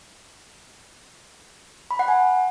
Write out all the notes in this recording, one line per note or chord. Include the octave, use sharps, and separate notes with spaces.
B5
F#5
G#5